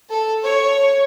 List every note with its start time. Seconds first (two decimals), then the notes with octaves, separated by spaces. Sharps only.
0.10 A4
0.43 C#5